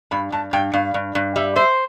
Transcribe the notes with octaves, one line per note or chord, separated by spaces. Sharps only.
G2 B5
G2 A5
G2 G5
G2 F5
G2
G2
G3 E5
C5 E5